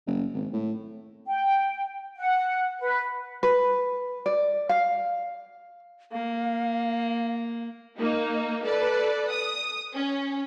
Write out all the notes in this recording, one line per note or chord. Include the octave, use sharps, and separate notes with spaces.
F#1
G#1
A2
G5
F#5
B4
B4
D5
F5
A#3 F5
A#3 D#4
A4 B4 D5
D#6
C#4